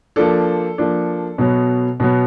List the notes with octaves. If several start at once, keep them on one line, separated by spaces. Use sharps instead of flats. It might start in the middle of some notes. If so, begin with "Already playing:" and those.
F3 A#3 D4 A4
F3 A#3 D4
B2 F#3 B3
B2 F#3 B3